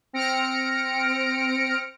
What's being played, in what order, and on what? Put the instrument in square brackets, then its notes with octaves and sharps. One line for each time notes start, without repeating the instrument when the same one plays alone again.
[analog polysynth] C4 F6 A#6 C#7 D7